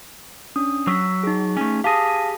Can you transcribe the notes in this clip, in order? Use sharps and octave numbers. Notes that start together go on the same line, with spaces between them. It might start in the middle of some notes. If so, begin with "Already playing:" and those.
C#4 D4 D#6
F#3 E6 B6
D#4 G#4
A3 C#4
G4 G#4 F5 A5 A#6